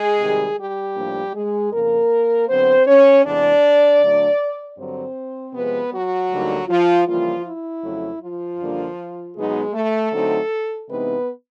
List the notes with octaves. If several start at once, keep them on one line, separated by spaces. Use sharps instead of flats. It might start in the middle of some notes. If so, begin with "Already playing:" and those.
Already playing: G#3 G#4
C3 D#3 G3
G3 G4
A2 F3 A#3 D4
G#3 G#4
F2 C#3 F3 A#3 A#4
D3 F#3 B3 C4 C5
C#4 C#5
E2 C3 E3 G#3 D4 D5
D3 F#3 A3 D4
G2 D3 F#3 C4 C5
C3 F3 G#3 B3 B4
F#3 F#4
D2 D3 G3 A#3 D#4
F3 F4
C#3 E3 F3 G3 A#3 F4
E4
F2 C#3 F#3 A3
F3 F4
F#2 D3 G3 A#3 D4
B2 F#3 G#3 B3 D#4 G#4
A3 A4
D3 F#3 A3 C4 D#4
C3 E3 G#3 B3 C4 D#4 B4